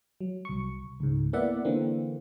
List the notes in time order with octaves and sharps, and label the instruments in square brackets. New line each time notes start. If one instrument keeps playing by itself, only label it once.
[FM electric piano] F#3
C2 C#6
C#2 G#2
A#3 B3 E4 D5 E5 F#5
D3 E3 A#3 C4